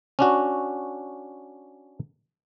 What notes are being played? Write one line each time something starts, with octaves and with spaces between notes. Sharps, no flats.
C#4 D4 F#4